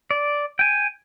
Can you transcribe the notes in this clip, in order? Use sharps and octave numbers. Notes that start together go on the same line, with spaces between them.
D5
G5 G#5